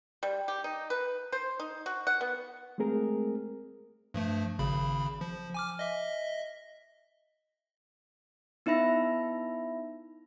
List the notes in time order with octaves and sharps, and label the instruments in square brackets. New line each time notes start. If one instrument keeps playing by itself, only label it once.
[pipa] G3
G4
D#4
B4
C5
D#4
F#4
F#5
B3
[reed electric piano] G#3 A3 C4 G#4 A#4
[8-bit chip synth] G2 F3 A3
G#1 C#3 B5
F3
G#5 D6 F6
D#5 E5
[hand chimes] B3 D#4 E4 E5 B5 A#6